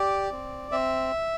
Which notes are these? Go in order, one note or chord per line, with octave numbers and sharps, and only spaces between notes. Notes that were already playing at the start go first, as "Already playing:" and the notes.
Already playing: G4 D5
C4
C4 E5